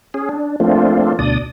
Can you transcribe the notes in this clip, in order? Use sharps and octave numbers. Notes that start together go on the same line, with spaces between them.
C#4 G#4
D4
F3 A3 A#3 C4 D4 F4
D2 B2 D4 D5 D#6